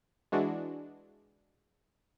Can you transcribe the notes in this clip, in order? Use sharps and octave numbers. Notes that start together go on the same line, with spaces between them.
E3 G#3 D4 F#4